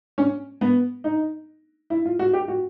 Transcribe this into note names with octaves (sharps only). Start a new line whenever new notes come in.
C#4
B3
D#4
E4
F4
F#4
G4
F#4